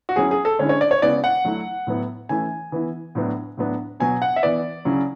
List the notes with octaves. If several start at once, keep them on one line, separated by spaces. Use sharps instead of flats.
F#4
F#3 C#4 E4 G#4
G#4
A4
D3 G#3 C#4 E4 C#5
C#5
D5
C#5
C#3 G#3 B3 E4 D5
F#5
F#3 A3 E4
A2 F#3 B3 E4
E3 A3 C#4 E4 G#5
E3 B3 E4
A2 F#3 B3 D4
A2 F#3 B3 D4
B2 F#3 B3 G#5
F#5
E5
E3 B3 E4 D5
C#3 F#3 C#4 E4